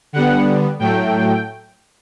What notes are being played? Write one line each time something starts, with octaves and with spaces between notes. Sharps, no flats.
D3 G3 B3 F#5
A2 F#3 A3 G5